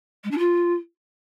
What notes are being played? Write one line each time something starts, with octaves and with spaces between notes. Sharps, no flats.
G#3
D4
F4